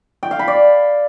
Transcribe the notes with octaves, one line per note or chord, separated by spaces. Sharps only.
G5
F5
B5
D5